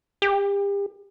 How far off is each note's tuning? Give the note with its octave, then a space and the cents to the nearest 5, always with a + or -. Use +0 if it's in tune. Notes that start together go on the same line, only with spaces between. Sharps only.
G4 +35